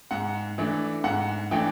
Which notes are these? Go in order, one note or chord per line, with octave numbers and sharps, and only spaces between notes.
G#2 F#5
E3 A3 D4
G#2 F#5
E3 A3 D4 G5